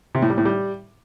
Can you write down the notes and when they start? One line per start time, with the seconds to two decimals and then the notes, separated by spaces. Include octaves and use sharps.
0.15 C3
0.22 A2
0.30 G3
0.38 A2
0.45 G3